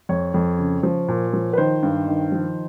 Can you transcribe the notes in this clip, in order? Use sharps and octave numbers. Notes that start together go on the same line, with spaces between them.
F2 C#5
F2
C#3
F3
A#2
F3
B4
D#3 C5
G2
D#3
F3